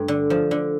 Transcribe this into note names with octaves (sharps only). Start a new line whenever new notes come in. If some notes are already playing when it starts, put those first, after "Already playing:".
Already playing: G2 A3
D3
F3
D3